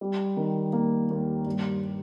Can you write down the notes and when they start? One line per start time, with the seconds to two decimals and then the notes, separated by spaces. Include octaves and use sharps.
0.01 G3
0.37 D#3
0.73 A#3
1.10 D#2
1.46 G2